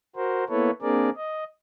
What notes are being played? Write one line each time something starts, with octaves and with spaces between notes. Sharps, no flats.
F#4 A#4 C5
A#3 B3 E4 A4 B4 C#5
A#3 C4 D4 G#4 A#4 D5
D#5